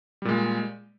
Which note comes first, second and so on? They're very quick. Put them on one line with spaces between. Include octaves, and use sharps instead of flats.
G3 A#2 G#3